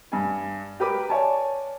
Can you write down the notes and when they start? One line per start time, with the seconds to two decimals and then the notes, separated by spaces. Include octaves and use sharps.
0.12 G2 G#5
0.80 G4 A#4 B4 B5 D6
1.09 C#5 D5 G#5 A5